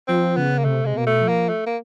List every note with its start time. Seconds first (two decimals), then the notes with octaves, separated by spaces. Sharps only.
0.08 F3 C4
0.36 C#3 B3
0.58 A#3
0.64 C3 A3
0.84 C3 G#3
0.93 B2 A#3
1.06 A3
1.21 F3
1.28 A#3
1.49 A3
1.66 A#3